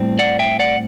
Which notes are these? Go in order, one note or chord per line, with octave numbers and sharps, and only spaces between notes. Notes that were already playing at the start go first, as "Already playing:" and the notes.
Already playing: A2 G3 C4
D5 F#5
E5 G5
D5 F#5